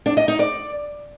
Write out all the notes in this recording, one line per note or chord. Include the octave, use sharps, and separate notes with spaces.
D4
D#5
D#4
D5